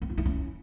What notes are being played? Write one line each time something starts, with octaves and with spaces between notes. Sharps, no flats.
C4
F4
E4
C#4